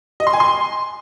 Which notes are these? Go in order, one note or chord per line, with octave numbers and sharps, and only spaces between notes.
D#5
C6
G#5
C6